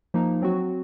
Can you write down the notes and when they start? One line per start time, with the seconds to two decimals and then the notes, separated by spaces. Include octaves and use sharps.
0.14 F3 A#3 D#4
0.42 F#3 C4 F#4